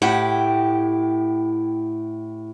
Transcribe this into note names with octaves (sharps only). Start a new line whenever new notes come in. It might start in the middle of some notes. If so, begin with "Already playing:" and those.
A2 E4 G4 F#5 G5